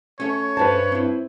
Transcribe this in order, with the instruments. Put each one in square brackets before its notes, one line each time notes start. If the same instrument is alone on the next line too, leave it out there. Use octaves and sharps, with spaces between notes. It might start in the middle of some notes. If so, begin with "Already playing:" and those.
[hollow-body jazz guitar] A3 C#4 [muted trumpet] C#5
[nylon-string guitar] G2 A5 [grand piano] B4 C5
[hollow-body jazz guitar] C4 E4